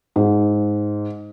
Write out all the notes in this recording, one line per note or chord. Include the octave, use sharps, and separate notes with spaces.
G#2